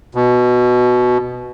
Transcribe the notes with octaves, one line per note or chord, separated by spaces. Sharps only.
B2